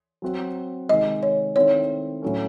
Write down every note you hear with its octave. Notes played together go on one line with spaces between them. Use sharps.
F#3 C4 F#4
C3 D#3 G#3 D#5
C#5
D#3 A3 C4 E4 C#5
A2 F#3 A3 C#4